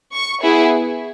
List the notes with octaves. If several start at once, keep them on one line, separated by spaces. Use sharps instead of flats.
C#6
B3 E4 G#4